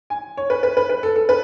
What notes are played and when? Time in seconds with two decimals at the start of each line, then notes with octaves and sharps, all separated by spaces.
0.10 G#5
0.37 C#5
0.50 B4
0.63 B4
0.77 B4
0.89 B4
1.03 A4
1.16 A4
1.29 B4